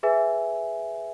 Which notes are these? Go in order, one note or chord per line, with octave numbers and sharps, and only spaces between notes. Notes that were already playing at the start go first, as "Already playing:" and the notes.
G#4 B4 E5 G#5